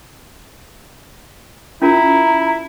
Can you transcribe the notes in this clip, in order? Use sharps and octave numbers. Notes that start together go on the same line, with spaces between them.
C#4 E4 F4 A#4 A#5